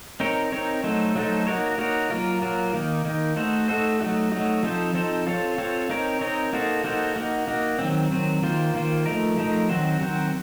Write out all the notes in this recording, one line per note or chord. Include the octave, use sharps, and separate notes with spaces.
C4 D#4 A#4 C#5
C4 D#4 A#4 C#5
F#3 A3 D#4 A4 C5
F#3 A3 D#4 A4 C5
A#3 D#4 F#4 A#4 C#5
A#3 D#4 F#4 A#4 C#5
F#3 A#3 F4 A#4
F#3 A#3 F4 A#4
D#3 A#3 D#4
D#3 A#3 D#4
A3 D#4 F#4 A4 C5
A3 D#4 F#4 A4 C5
F#3 A3 D#4 F#4
F#3 A3 D#4 F#4
F3 C4 D#4 A4 C5
F3 C4 D#4 A4 C5
C4 F4 A4 C#5
C4 F4 A4 C#5
C4 D#4 A#4 C#5
C4 D#4 A#4 C#5
A#3 D#4 F#4 A4 C5
A#3 D#4 F#4 A4 C5
A#3 D#4 F#4
A#3 D#4 F#4
D#3 F#3 C4
D#3 F#3 C4
D#3 A#3 F4 C5
D#3 A#3 F4 C5
F3 A3 D#4 A#4
F3 A3 D#4 A#4
D#3 F#3 C4 F#4 C5
D#3 F#3 C4 F#4 C5